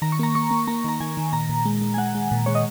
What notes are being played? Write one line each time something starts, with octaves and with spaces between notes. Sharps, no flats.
D#3 A#5
C#6
A#3 A#5
A#3 C#6
A#3
A#3 A#5
D#3 A#5
D#3 G#5
D#3
A#2 A#5
A#2
G#3
G#3
G#5
G#3 F#5
G#3
A#2
G#3 C#5
D#5